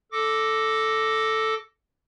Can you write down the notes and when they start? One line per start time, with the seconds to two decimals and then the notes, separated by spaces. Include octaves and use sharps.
0.12 A4 D6 A#6